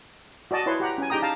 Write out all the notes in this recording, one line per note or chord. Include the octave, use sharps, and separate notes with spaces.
F#4 D5 D#5 A5
E4 B4 C#5 C6
G4 F#5 A#5
C#4 G#5
D#4 G4 G#4 G5 A#5 D#6
F5 A5 A#5